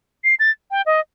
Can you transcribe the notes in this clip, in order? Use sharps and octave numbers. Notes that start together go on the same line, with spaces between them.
C7
A6
G5
D#5